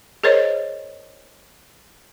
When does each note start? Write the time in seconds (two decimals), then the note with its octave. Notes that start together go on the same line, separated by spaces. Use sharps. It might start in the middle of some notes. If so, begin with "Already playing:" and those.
0.24 G#4 A#4 C5 C#5 D#5